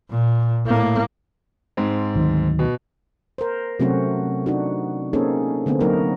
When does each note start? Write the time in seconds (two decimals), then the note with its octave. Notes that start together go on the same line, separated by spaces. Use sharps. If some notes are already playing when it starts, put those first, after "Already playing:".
0.11 A#2
0.66 A2 A#3
1.77 G#2 C4
2.16 D2 D#3 F#3
2.59 B2
3.38 A#4 C5
3.80 C3 F#3 A3 C4 C#4 F#4
4.46 D4 D#4 F#4
5.13 A#3 C4 C#4 D#4 G#4 A4
5.66 D3 A3 B3 C4
5.80 F#3 A#3 D#4 F#4 A#4